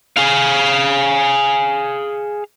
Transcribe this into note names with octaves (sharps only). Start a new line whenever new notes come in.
G#4 F5